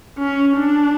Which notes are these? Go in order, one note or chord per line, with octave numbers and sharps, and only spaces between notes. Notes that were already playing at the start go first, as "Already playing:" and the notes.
C#4
D4